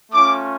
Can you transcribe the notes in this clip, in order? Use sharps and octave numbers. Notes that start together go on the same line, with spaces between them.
A3 C#4 F4 D6